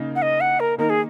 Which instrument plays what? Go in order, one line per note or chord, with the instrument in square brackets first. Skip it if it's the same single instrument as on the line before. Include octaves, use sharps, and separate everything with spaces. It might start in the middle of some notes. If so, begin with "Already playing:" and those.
Already playing: [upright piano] C#3 A#3 D#4
[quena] F#5
D#5
F#5
A#4
[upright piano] D#3 A#3 D#4 [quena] A#4
[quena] G#4